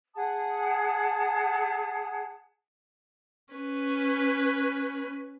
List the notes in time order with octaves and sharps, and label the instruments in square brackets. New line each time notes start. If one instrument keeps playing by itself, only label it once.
[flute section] G#4 F#5 A5 D#6
[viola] C#4 B4